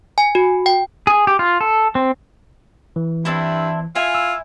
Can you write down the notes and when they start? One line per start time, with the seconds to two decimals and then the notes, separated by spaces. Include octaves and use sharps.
0.18 G#5
0.35 F#4
0.66 G5
1.07 G#4
1.27 G4
1.39 F4
1.61 A4
1.95 C4
2.96 E3
3.25 G2 C4 D4 E4
3.95 E4 F4 G#5
4.15 E6